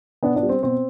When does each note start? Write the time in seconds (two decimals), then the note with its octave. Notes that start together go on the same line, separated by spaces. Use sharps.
0.23 B2 B3 D4
0.36 B3 D4
0.43 G3
0.49 C4
0.63 B2 C4